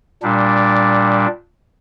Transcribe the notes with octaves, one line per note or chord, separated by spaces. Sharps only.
A#2 G3 D4